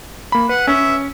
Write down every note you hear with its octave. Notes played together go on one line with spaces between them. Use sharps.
A#3 B5
B4 F#5
C#4 E5